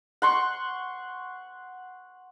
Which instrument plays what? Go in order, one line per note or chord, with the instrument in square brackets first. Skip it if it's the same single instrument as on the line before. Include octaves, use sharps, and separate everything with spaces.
[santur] F#5 C6 C#6